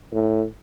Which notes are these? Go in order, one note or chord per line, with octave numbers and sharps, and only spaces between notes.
A2